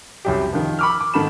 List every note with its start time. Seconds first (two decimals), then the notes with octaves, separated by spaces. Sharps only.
0.25 C2 F#2 G4
0.52 D#3 F3
0.79 B5 C#6 D6 E6 F6
1.01 D6
1.14 G#2 D#3 A4 B5 E7